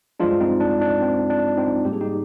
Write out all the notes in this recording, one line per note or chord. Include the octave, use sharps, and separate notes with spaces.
G2 F3 G#3 D4 F4
C4 D#4
D4
D4
C4
D4
C4 D#4
G#2 G3 A#3 G4
G#4
D#4 G4